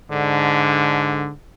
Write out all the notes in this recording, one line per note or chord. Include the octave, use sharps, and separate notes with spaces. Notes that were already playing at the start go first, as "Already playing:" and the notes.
G#2 D3